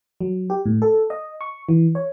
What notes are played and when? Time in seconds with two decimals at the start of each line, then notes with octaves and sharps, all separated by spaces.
0.21 F#3
0.50 G4
0.65 A2
0.82 A4
1.10 D#5
1.41 C#6
1.69 E3
1.95 C#5